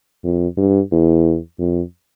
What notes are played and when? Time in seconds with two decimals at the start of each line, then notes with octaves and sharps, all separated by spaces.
0.24 F2
0.57 G2
0.92 E2
1.59 F2